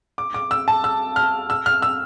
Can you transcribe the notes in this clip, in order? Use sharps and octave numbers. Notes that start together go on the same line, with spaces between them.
D6
D6
E6
A5
E6
F6
E6
F6
E6